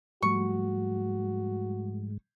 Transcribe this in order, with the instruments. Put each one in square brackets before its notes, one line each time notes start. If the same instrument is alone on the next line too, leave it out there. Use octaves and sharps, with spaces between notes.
[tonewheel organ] G#2 [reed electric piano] F3 G3 A3 [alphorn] F#4 [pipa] C#6